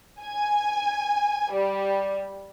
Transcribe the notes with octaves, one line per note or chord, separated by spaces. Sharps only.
G#5
G3